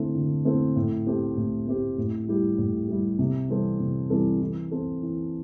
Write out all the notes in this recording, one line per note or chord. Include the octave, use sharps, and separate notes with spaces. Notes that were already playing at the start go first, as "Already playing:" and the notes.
Already playing: D3 A3 C4 E4 A4
D3
A3 C4 E4 A4
A2
A3 C4 G4
A2
A3 C4 G4
A2
G3 E4 G4
A2
G3 E4 G4
C3
E3 G3 C4 A4
C3
E3 G3 C4 A4
E3
C4 A4
E3